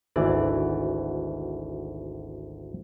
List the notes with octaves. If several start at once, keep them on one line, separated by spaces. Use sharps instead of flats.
G#1 D2 E3 D5